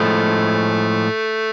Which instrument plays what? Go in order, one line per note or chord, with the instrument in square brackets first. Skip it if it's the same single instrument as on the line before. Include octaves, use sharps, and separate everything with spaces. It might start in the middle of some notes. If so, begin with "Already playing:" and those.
Already playing: [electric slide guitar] A2 F3 G#3 [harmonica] A3